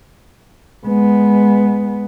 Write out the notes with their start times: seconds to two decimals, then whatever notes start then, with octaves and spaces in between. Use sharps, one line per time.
0.86 G#3 B3